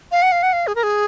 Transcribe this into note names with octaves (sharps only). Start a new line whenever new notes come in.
F5
F#5
F5
F#5
F5
G#4
A#4
G#4